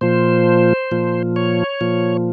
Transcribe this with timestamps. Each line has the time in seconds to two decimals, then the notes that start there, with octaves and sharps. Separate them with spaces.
0.01 A#2 F3 C5
0.91 A#2 F3
1.36 C#5
1.81 A#2 F3